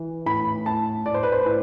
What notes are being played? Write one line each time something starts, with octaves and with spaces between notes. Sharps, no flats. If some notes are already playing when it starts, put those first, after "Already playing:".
Already playing: E3
A2 B5
A2 A5
A2 D5
C5
B4
C5
A2